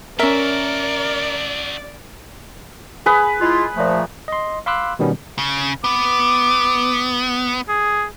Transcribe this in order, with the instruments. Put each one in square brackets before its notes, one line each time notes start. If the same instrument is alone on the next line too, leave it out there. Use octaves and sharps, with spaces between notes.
[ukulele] C#4 E5 [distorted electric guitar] F#4 A4 [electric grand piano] A#4 [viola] D5
[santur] G#4 B4
[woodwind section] G#3 E4 F4
A#2 F3 A3
[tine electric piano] D#5 C6
F5 B5 C6 D6 E6 F#6
B2 D#3 G3 B3 C#4
[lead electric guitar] C#3
[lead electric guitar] B3 [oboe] D6
[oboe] G#4